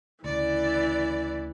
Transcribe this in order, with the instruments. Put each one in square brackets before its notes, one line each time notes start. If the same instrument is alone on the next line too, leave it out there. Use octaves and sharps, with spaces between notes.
[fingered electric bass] D2 C#3 [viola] E3 [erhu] D5